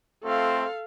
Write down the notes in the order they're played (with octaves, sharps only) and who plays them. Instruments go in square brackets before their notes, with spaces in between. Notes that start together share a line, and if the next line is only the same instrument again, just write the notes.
[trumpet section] A3 C4 F4 [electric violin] A4 F5